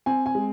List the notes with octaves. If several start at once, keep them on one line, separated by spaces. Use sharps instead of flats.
C4 G#5
G#5
G#3